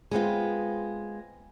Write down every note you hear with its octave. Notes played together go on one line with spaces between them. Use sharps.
G#3 B3 C4 F4